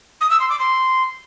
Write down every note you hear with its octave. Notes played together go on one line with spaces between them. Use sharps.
D#6
E6
C6
D6
C6